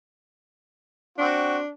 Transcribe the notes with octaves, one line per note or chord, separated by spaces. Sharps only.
C4 D4 F#4